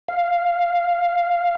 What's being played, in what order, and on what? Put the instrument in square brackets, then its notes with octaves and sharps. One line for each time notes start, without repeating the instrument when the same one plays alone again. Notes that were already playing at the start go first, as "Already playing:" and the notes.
[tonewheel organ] F5